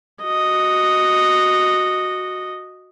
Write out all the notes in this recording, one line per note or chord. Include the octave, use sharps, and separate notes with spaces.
F#4 D#5